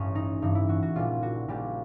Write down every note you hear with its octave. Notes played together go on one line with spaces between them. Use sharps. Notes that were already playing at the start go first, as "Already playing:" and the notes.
Already playing: A1 G2 C#4
D#4
A1 G2 E3 D#4
E4
F#4
F#4
A#1 A#2 G3 F4
F#4
A#1 A#2 G3 G4